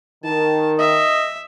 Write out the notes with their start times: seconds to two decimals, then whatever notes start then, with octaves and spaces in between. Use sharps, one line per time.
0.24 D#3 A5
0.79 D#5 E5